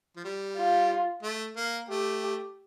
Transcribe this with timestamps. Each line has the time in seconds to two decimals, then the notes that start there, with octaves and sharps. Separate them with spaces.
0.16 F3
0.24 G3
0.57 F4
1.23 A3
1.56 A#3
1.89 A3 G4